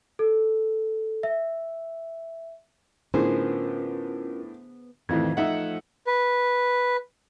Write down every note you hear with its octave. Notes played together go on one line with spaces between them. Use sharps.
A4
E5
A2 D3 B3 C#4 F4 G#4 A#4 C5
F2 A2 D#3 E3 C4 F5 G#6
F3 A3 D#4 E5 F#5
B4